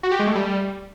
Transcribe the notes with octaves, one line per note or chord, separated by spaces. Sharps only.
F#4
G4
G#3
A3
G3